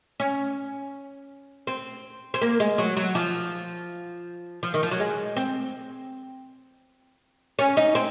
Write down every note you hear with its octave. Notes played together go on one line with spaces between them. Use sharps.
C#4
C4
C4
A#3
G#3
F#3
F#3
F3
F3
D#3
F3
F#3
G#3
C4
C#4
D#4
C4